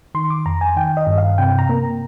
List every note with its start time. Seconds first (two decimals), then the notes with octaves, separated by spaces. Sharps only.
0.15 D#3 C6
0.30 D6
0.46 F2 A#5
0.61 G#5
0.76 D#3 G5
0.97 D#5
1.07 G2
1.18 F5
1.38 C3 G5
1.59 A#5
1.69 A#3